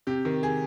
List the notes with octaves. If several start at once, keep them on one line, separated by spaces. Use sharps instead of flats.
C3 G4
D#3
G#4